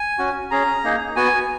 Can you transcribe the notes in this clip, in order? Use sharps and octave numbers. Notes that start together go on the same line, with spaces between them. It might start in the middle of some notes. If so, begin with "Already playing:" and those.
Already playing: G#5
C#4 F#4
C#4 G#4 A#5
A#3 D#4 G#4
B3 F#4 G#5